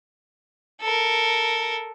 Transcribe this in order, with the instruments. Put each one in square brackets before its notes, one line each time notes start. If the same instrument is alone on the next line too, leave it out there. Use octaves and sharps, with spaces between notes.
[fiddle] A4 A#4